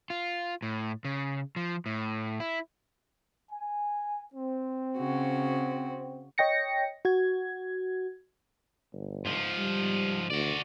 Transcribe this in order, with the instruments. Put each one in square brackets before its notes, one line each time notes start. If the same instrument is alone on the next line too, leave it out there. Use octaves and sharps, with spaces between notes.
[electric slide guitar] F4
A2
C#3
F3
A2
E4
[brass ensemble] G#5
C4
[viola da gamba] C#3 F#4
[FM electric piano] C#5 D#5 G5 A#6 C#7
F#4 G#6
[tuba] G1
[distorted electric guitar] G#2 F3
[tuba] G3
[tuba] D2 [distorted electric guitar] F#4 D5